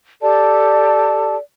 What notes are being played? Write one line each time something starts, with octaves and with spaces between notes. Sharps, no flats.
G4 A4 D5 A5